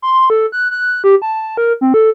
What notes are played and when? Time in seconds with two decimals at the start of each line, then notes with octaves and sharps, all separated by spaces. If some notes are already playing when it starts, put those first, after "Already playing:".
0.02 C6
0.30 A4
0.52 F#6
0.71 F#6
1.04 G4
1.22 A5
1.57 A#4
1.81 C4
1.94 A4